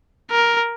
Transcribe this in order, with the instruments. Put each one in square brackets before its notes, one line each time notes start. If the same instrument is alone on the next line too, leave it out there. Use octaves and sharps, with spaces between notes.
[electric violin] A#4